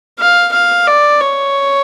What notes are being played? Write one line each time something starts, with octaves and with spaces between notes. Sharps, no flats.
F5
F5
D5
C#5